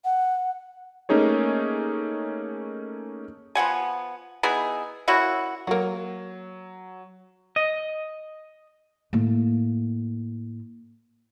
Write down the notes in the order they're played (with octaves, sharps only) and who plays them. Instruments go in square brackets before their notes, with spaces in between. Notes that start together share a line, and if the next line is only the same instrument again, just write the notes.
[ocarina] F#5
[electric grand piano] A3 A#3 C#4 D#4 G#4 C#5
[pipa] F3 B3 F#5 G#5
B3 D#4 E4 G#4
A#3 C#4 E4 F#4
[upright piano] F#3 [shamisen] A#3 F#4
[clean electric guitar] D#5
[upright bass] A2 A#3